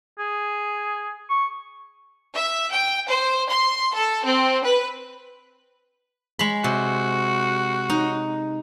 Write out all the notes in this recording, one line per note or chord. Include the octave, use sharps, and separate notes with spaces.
G#4
C#6
E5
G5
C5
C6
A4
C4
B4
G#3 B5
C3 F#4
D#4